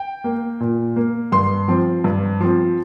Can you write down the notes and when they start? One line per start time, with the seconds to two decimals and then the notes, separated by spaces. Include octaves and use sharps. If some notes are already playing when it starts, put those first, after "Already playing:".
Already playing: G5
0.24 A#3
0.60 A#2
0.96 A#3
1.32 G2 C6
1.68 F3 C4
2.04 G2
2.40 F3 C4